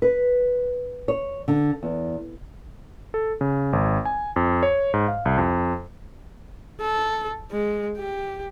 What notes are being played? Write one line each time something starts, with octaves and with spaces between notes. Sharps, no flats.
B4
C#5
D3
E2
A4
C#3
G#1
G#5
F2
C#5
G#2
F5
C2
F2
A4
G#3
G4